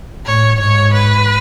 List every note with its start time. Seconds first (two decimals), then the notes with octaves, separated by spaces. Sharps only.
0.26 A2 C#5
0.60 G#2 C#5
0.93 B4